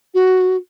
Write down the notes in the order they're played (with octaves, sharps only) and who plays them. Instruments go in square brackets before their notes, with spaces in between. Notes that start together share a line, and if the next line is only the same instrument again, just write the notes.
[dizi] F#4